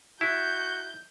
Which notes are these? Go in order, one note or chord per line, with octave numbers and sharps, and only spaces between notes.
E4 F#4 G6